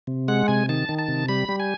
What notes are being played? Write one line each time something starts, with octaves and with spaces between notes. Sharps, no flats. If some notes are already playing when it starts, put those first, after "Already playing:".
C3
G#3 F#5
C3 G#5
D#3 A5
D#3
A5
C3
G3 B5
G3
G#5